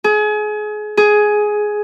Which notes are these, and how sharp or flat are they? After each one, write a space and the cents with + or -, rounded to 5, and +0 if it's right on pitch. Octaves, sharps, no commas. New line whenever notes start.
G#4 +30
G#4 +10